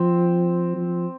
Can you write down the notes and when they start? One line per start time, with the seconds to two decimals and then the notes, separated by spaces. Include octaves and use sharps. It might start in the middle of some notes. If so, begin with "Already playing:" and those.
Already playing: F3 C4
0.76 F3